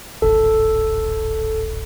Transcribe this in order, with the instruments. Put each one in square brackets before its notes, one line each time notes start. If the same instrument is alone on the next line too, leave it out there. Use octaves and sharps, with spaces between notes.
[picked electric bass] D1 G#1 [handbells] A4